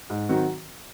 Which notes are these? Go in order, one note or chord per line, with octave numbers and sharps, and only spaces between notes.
G#2
D#3 F#3 C4 F#4